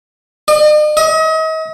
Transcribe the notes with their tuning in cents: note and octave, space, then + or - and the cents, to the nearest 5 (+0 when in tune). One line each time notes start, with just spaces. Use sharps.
D#5 -45
D#5 +40